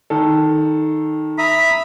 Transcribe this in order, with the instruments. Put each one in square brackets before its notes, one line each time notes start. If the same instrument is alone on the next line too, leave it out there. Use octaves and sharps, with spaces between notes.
[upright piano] D#3 A4
[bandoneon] E5 A#5 D#6 [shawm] B5